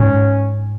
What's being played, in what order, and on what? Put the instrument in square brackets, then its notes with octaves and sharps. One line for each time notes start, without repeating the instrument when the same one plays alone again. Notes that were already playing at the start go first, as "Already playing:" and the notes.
Already playing: [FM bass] G#2 [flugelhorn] C#4